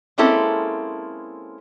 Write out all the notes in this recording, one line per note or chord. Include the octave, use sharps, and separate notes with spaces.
G#3 A#3 C4 C#4 E4 A4